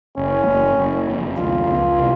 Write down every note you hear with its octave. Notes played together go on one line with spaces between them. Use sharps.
F#1 C#4
F#1
F#1
F2
C#2 F4
C#2
C3